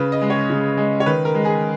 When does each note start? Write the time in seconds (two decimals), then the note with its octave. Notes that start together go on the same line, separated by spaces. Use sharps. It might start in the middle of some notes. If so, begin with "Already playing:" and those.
Already playing: C#3 B4
0.12 D#5
0.22 G#3
0.30 C#5
0.50 C#3
0.77 G#3
1.00 C#5
1.06 D#3 B4
1.25 A#4
1.35 G#3
1.45 G#4